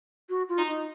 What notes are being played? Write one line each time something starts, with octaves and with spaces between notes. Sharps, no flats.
F#4
F4
D#4
D#4